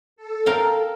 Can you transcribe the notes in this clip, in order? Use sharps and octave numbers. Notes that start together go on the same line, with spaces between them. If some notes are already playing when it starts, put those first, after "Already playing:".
A4
A#4 F5 G5